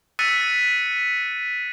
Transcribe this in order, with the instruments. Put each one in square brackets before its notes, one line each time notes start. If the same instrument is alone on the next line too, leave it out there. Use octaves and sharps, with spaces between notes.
[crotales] E6 F#6 A6 B6 C#7 D#7